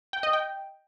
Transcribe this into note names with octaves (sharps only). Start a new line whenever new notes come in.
G5
D#5
G5